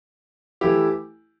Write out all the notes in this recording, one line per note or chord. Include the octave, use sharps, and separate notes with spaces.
E3 A3 E4 G4